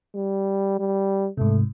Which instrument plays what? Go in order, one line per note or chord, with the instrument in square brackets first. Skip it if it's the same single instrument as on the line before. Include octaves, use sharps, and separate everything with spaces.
[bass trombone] G3
G3
[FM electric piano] G#2 C3 [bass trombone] A3